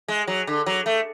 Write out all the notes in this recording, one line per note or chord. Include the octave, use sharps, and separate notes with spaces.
G#3
F#3
D3
F#3
A3